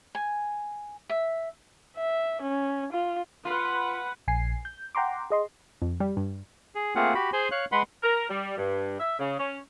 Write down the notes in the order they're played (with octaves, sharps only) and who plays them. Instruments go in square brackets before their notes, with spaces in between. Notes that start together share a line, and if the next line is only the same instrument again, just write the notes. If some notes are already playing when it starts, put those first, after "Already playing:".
[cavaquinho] G#5
E5
[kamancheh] E5
C#4
F4
[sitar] F4 [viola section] B4 F#5
[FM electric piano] A#1 G#5 C7
G6
F#5 G5 A#5 C6 D6
G#4 D#5 C6
[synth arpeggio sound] F2
G3
G2
[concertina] G#4
A3 A#3 C4 F4 G#4 F#5
F#4 G4 B5
G#4 C5 G#5 C6
C#5 F5 F#6
G#3 B4 F#5 B5 C6
[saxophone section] A#4
G3
G2
E5
C#3
C#4